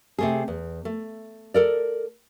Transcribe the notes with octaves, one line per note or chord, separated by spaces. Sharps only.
C3 A3 G#4
E2
A3
A4 A#4 D5